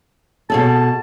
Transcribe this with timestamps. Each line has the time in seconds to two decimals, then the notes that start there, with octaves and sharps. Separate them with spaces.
0.50 B2 G#4 A4 A5